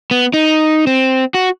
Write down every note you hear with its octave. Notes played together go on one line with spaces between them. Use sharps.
B3
D#4
C4
F#4